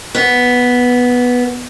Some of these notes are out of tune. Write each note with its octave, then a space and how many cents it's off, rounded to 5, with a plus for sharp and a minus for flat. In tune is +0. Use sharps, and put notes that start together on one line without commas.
B3 -5